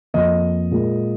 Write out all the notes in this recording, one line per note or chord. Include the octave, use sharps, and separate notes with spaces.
F2 F3 A#3 D#5
A#2 G#3